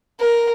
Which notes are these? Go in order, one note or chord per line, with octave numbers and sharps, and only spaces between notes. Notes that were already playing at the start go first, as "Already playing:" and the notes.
A#4